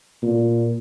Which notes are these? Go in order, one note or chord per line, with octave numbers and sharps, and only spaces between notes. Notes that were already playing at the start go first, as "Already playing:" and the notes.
A#2